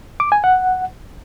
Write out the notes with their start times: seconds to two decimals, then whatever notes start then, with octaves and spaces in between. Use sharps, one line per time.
0.20 D6
0.32 G#5
0.44 F#5